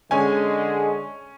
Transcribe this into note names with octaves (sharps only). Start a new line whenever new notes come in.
D3 G#3 C#4 G#5